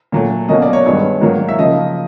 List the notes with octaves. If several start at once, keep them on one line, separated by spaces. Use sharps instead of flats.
A#2 F#3 A3
B2 F#3 A#3 C#4 D#5
D5
C#5
G2 D#3 G#3 B3 C#5
G#2 D#3 F#3 A#3
E5
C#3 F3 A#3 D#5